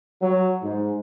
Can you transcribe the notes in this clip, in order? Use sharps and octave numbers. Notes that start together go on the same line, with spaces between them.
F#3
G#2